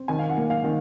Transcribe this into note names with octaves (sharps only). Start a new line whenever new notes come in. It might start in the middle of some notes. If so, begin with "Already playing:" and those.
Already playing: C4
D#3 G#5
F5
F#5
A#3
F5
D#3